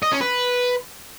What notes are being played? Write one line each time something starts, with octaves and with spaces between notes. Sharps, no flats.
D#5
C#4
B4